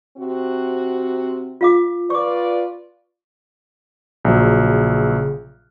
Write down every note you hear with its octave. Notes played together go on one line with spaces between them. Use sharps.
C3 C4 F#4
F4 F5 D6
F4 B4 D5 C#6 D6
A#1 C#3 F#3